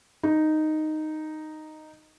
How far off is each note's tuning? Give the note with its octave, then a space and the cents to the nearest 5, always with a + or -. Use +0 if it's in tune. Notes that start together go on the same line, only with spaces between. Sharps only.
D#4 -5